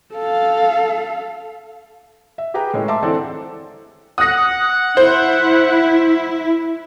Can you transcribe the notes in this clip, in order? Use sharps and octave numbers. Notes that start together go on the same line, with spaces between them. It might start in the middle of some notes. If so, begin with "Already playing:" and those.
A4 F5
E5
G4 G#4 B4 G5 A#5
A2 G#3 C#4
E5 A5 C6 D6
D3 E3 C4 D4 A4 D5
F#5 D#6 A#6
E4 C5